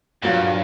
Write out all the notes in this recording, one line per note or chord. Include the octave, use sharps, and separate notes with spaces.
G2 A#2 F#3 A#3